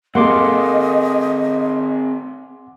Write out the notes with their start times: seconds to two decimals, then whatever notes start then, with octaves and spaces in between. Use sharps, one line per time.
0.15 A#3 C4 G#4 A4 D#5 F#5 C6 D6